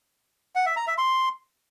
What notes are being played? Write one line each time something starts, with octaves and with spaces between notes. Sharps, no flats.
F#5
E5
A#5
E5
C6